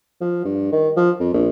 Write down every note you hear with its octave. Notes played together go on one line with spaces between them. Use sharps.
F3
G2
D#3
F3
F2
A#1